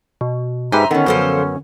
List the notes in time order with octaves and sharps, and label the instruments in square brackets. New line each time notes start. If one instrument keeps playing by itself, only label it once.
[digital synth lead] B2
[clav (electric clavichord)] G#2 G4 B4 [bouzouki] C5 [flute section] E5 A#5 C6 [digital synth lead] G#5
[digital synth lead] D3 [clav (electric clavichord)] D#3 [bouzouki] G3 B3 [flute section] C#4
[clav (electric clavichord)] F#2 B3 [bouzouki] F3 A4 C5